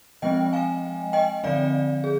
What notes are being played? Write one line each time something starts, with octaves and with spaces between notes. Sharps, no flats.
F3 G#3 C4 D#5 G5
F5 G#5
D#5 G5
D3 F3 C4 D5 F5
G#4